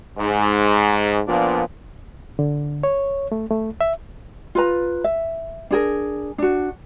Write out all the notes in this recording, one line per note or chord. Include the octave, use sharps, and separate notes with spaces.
G#2
A#2 F3 B3 D4 F4
D3
C#5
A3
A3
E5
F4 B4 A#5
E5
D4 G#4 A#4
D4 F#4